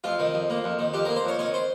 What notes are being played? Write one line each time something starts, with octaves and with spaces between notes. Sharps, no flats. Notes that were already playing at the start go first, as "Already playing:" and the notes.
F2 F4
D#3
F2
A#3
F2
D#3
F2 G4
A#3 A#4
C5
F2 C#5
D#3 C#5
C5